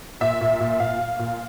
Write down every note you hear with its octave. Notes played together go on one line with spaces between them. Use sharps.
A#2 E5
A#2
A#2
A#2 F5
A#2
A#2